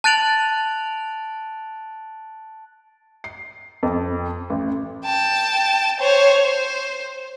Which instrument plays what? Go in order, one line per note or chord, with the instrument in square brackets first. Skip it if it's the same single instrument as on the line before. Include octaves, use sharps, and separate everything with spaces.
[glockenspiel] A5 F#6 A6 D7 F7 F#7
[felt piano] C7
F2
A1
[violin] G5 A5
C5 C#5
C5